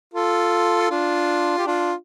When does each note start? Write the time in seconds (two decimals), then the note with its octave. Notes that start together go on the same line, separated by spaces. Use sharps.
0.14 F4 A4
0.90 D4 F4
1.58 G4
1.67 D4 F4